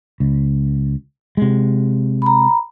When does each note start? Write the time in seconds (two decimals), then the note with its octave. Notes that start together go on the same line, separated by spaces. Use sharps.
0.20 C#2
1.37 C3 G#3
2.22 A#5 B5